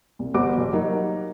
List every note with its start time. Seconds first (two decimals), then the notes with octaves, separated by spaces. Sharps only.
0.19 C2
0.34 G1 G3 F#4 C5 D6
0.58 F#1
0.73 F#3 G3 A#3 D#4